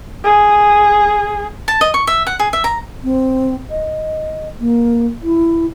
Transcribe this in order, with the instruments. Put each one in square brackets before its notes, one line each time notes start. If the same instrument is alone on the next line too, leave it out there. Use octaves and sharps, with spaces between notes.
[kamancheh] G#4
[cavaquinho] A5
D#5
C#6
E5
F#5
G#4
E5
A#5
[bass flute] C4
D#5
A#3
E4